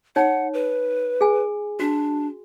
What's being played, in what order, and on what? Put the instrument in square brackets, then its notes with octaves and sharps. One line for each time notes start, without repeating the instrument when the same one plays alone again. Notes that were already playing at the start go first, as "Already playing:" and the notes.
[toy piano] D#4 C#5 [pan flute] F#5
[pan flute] B4
[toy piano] G#4 G#5
[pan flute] D4 [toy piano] F#4